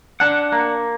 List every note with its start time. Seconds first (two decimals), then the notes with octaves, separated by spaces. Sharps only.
0.20 D4 F#5
0.52 A#3